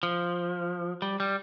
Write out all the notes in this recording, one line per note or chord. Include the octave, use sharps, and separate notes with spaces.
F3
G3
G3